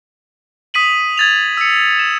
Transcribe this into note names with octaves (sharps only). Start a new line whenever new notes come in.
D#6 B6 D#7 F#7
G#6 A6 F7
E6 C#7
E7